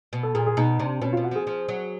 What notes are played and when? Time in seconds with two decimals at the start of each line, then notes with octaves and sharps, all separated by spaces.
0.13 B2
0.23 A4
0.35 A#2 G#4
0.46 G#4
0.57 B2 D#4
0.80 C3 D4
1.02 B2 C#4
1.13 B2 F4
1.24 F#4
1.31 F3 G#4
1.47 F3
1.69 F#3